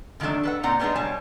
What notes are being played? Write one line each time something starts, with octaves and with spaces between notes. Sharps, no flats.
D3 D#3 F3 F#3 A3 D4
A4 B4 F#5
A#2 C4 D#4 D5 F#5 A#5
G3 G#3 B3 D4 D#4 G#4
B2 G3 C#5 G#5 A5